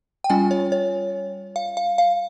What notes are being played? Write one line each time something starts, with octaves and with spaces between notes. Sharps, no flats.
G5
G3 C#4 F4 G#5
C#5
C#5
F5
F5
F5